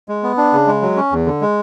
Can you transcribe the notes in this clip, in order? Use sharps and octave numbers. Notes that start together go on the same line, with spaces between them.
G#3
B3
D4
C#3
G#3
F#3
C#4
E2
D3
G#3